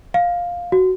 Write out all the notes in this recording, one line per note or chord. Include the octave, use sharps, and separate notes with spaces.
F5
F#4